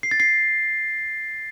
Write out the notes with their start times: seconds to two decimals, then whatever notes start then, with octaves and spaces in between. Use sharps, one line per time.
0.03 C7
0.11 A6
0.20 C7